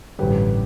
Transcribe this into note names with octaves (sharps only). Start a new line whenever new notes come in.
A1 G2 D3 G4 B4